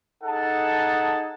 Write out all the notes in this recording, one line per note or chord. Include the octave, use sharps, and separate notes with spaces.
D#4 G#4 A4 F#5 A5